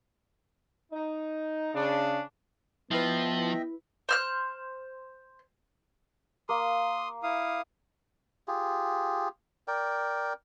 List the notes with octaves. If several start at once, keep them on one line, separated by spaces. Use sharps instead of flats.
D#4
C#3 D4
F3 B3 E4 B4 D#5 E5 G5
C5 F6 F#6
A#3 C6 D#6
E4 F5 D#6
F4 G4 G#4
A#4 D5 G5